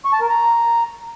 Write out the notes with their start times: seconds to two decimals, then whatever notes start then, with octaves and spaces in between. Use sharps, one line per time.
0.05 C#6
0.13 A5
0.21 A#4
0.29 A#5